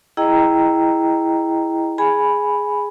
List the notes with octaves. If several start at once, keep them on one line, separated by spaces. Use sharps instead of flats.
E4 G#4 D#5 G5 A#5
G#4 G#5 B5